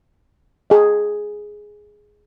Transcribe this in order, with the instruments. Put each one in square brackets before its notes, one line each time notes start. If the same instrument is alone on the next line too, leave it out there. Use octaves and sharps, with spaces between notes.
[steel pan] G#4 D#5